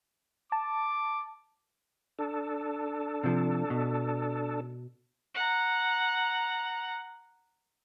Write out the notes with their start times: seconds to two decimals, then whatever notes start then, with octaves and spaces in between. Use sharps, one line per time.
0.52 A5 D6
2.19 D4 A4
3.24 C3 F3
3.70 B2
5.35 F#5 A#5